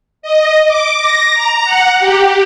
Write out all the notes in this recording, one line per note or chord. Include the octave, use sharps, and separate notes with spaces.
D#5
D6
A#6
A#5
F#5
G4